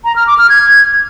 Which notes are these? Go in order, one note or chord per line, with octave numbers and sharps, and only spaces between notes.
A#5
F6
D6
F6
G#6